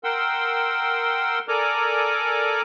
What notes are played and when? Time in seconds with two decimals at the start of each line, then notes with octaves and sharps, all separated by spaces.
0.04 A#4 F#5 G5 C6 E6
1.48 A4 A#4 D5 G#5 A#5 D6